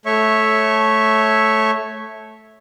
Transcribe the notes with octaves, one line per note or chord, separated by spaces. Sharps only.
A3 C#5 E5 C#6